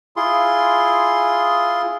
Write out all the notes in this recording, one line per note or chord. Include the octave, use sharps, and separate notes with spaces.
E4 F4 G#4 C6